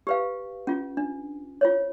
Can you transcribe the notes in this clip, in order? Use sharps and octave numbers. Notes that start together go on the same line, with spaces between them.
G4 B4 F5
C#4 F4
D4
F4 C5 C#5